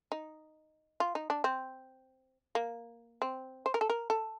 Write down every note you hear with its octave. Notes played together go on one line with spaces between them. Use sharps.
D#4
F4
D#4
D4
C4
A#3
C4
C5
A#4
A4
A#4
A4